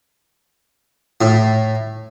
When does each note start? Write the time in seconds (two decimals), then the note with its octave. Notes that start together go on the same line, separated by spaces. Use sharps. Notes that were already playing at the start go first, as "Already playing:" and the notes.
1.21 A2